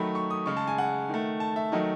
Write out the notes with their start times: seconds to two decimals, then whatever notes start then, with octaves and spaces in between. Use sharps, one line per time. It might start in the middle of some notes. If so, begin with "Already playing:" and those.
Already playing: D#3 F#3 A3 B5
0.15 C#6
0.30 D#6
0.46 C#3 G#3 C#6
0.57 A5
0.68 G#5
0.78 F#5
1.09 D#3 A3
1.40 A5
1.56 E5
1.72 D#3 F#3 A3 D#5